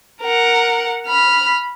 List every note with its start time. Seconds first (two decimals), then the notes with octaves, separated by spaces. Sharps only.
0.22 A#4 F#5
1.07 B5 F6